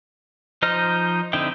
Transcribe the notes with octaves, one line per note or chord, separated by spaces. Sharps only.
F3 D#4 C5 D#5 F6
D3 C4 D#4 E4 G5